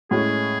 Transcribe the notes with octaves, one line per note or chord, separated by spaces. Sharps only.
A2 G#3 C#4 G#4